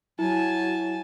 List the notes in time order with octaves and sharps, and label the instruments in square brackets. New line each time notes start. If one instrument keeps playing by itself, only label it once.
[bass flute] F#3 [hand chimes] E4 [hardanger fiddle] G#5 A5